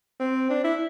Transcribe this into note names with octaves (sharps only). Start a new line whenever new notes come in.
C4
D4
E4